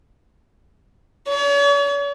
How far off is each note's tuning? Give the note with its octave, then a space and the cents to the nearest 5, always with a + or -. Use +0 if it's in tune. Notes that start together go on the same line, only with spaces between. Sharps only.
C#5 +40